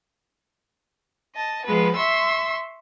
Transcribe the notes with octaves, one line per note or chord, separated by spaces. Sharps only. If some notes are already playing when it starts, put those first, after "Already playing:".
D#5 A5
F3 G#3 B3 B4
E5 C6 C#6 E6